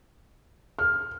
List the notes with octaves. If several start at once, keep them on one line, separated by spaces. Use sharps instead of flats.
F6